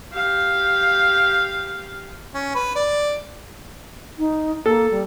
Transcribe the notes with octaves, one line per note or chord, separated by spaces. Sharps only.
G4 F5
C#4
B4
D5
D#4
A#3 A4
G3